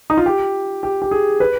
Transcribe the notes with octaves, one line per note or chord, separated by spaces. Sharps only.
D#4
F4
G4
G4
G4
G#4
B4